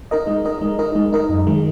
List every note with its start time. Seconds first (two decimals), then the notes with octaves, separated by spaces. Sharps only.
0.11 D#4 A#4 D#5
0.27 G#3
0.45 D#4 A#4 D#5
0.61 G#3
0.79 D#4 A#4 D#5
0.95 G#3
1.12 D#4 A#4 D#5
1.29 F#2
1.47 D#3 G#3